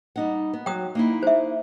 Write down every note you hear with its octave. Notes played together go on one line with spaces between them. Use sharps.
G3 D#4 F#5
B3
F#3 G5 D#6
A#3 D#4 E4
C5 E5